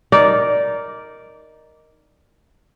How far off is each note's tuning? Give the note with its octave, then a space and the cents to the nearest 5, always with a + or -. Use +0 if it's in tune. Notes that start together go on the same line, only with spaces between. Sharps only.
D#4 +0 A#4 +0 D5 -10